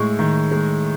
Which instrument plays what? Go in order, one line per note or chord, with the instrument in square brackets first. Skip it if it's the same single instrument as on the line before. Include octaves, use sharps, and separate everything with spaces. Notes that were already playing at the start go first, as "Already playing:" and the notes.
Already playing: [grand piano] A2 G#3 C#6
D#3
G#3